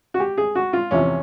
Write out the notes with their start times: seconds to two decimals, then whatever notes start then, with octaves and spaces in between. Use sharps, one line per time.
0.14 F#4
0.20 G4
0.38 G#4
0.55 F#4
0.73 F4
0.91 E2 C3 F3 C#4